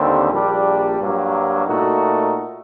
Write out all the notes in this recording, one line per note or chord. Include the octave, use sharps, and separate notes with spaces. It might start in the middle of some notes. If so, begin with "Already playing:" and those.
Already playing: D#2 D3 G3 C4
A#1 A#2 G3 D4
G2 F#3 A#3
A#2 A3 D#4 F#4